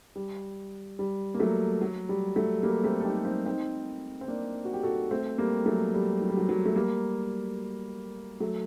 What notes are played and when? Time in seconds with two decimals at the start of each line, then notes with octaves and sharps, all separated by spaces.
0.16 G3
0.99 G3
1.34 A#3
1.40 F#3 A3
1.81 F#3
2.09 G3
2.36 F#3 A3
2.63 G3 A#3
2.84 A3 C4
3.01 A4
3.05 D#4 G4
3.25 C4 D#4
3.46 C4 D#4
4.21 C4
4.28 A#3 D4
4.65 F#4
4.74 G4
4.83 F#4 A4
5.11 A3 C4
5.38 G3 A#3
5.66 F#3 A3
5.94 G3
6.22 F#3
6.29 G3
6.37 F#3
6.49 F#3
6.66 A3
6.75 G3 A#3
8.40 F#3 A3